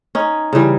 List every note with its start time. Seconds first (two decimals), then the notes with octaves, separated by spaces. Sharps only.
0.15 C#4 D#4
0.53 C#3 E3 G3